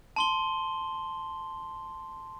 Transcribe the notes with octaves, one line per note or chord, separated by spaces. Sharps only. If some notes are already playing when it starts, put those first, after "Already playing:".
A5 C6 G7